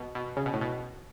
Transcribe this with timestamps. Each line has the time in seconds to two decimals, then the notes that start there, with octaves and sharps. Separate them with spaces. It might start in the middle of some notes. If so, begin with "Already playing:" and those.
Already playing: B2
0.15 B2
0.37 C#3
0.45 B2
0.54 A2
0.61 B2